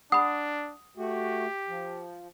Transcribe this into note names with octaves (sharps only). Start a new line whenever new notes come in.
D4 F#5 B5 D#6
A3 F#4 G4
F3